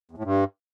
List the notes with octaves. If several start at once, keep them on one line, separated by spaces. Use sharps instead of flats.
E2
A2
G2